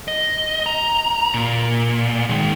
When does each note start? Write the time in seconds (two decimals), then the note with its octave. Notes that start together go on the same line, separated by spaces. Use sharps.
0.08 D#5
0.66 A#5
1.34 A#2
2.29 D#3 G#3